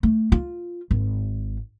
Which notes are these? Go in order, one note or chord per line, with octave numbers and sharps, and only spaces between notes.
A3
F4
G#1